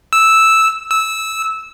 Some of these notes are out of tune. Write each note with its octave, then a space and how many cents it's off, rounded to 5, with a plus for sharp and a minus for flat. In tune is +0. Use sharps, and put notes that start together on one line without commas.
E6 -5
E6 -15